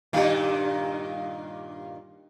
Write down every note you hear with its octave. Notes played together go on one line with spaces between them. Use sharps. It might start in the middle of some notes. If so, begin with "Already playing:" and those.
G2 A#2 D#3 G4 D#5 F5